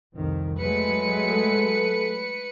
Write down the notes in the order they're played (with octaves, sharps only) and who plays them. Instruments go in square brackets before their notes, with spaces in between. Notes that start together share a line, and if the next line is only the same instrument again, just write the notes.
[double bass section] C2 F2 D#3
[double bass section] F#3 G#3 A3 [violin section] B4 C#7
[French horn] A4